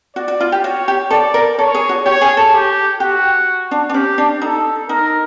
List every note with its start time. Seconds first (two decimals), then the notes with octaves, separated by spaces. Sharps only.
0.16 F#4 D5
0.28 F#4
0.41 F4
0.52 G4
0.64 F#4 C#5
0.88 G4
1.11 A4 D5
1.34 A#4
1.58 A4 C#5
1.75 G#4
1.89 F#4
2.06 G4 C#5
2.21 G#4
2.37 A4
2.53 G4
3.00 F#4 G4
3.71 D4
3.89 D4
3.94 C#4 G4
4.18 D4
4.42 D#4 A4
4.89 D#4 A#4